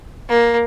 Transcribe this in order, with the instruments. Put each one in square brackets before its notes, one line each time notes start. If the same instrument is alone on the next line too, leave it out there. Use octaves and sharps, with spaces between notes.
[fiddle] A#3